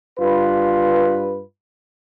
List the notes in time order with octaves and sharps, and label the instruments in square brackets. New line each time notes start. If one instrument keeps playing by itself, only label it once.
[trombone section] G2 F4 B4